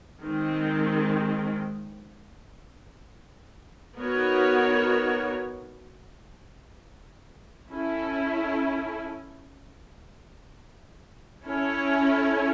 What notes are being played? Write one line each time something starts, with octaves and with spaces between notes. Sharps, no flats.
D#3 G#3 C4
B3 D#4 F#4 A#4 C#5
C#4 E4 A4
C#4 E4 A4 C#5